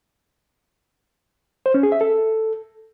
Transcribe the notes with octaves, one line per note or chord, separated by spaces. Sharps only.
C5
C#4
G#4
E5
A4